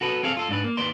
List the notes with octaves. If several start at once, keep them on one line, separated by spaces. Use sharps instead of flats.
F#4 A4 B4
C4 G#4 A4 F5
F4 A4
G#2 D4 B4
A#3
D#2 B4 D5 C6